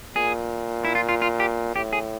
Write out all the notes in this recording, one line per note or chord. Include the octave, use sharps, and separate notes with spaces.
A#2 G#4
E4
F4
F4
F4
G4
A2 G4
G#4